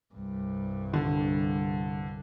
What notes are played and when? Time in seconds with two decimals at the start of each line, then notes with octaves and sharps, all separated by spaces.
0.14 C2 G2
0.93 D3